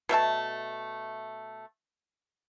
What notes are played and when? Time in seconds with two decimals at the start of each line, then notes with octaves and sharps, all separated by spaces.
0.09 B2 A3 E5 A5